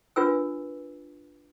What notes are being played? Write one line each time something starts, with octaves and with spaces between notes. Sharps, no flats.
D4 F4 A#4 B4 G#5 E6